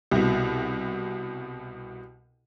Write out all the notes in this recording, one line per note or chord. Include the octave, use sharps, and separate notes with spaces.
C2 B2